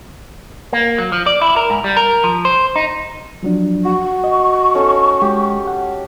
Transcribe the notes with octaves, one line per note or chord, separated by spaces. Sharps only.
A#3
F#3
F3
D5
E4
A#4
G#2
G3
A#4
F3
C5
D#4
F3 F#3 D4
F#4 C#6
D#5
C#4 D#4 A4
G#3 G4
F#5